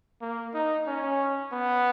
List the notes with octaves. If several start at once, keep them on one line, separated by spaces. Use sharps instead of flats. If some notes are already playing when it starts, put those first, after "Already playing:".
A#3
D#4
C#4
B3